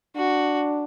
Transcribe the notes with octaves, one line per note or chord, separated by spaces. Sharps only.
D4 F#4